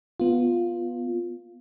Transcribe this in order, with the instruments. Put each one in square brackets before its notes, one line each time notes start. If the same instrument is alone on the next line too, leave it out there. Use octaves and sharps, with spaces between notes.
[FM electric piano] B3 F4